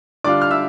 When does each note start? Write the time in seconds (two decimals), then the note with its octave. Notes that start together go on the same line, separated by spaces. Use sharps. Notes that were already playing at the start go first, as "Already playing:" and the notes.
0.24 D3 G3 D4 F4 D5 D6
0.41 F6
0.51 E5 E6